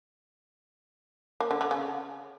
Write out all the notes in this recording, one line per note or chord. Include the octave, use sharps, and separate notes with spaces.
A#3
D3
D3
C#3